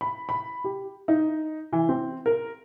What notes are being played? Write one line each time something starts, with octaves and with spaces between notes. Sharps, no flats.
B5
B5
G4
D#4
E3
C4
A#4